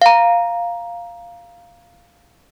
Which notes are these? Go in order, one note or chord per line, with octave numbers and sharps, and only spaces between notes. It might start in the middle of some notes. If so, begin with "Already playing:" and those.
F5 A#5